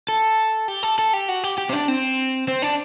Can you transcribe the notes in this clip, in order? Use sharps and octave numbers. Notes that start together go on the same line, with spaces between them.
A4
G4
A4
A4
G4
F#4
G4
G4
C4
D4
C4
C4
D4